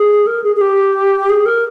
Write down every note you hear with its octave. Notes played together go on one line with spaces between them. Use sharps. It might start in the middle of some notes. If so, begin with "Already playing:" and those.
Already playing: G#4
A#4
G#4
G#4
G4
G#4
A#4